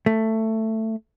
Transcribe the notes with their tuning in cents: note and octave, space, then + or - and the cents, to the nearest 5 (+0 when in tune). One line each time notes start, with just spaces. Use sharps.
A3 +10